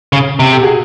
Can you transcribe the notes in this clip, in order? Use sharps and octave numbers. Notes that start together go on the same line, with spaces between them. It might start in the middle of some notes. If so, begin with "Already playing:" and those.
C#3
C3
G4 A4
F#4 G#4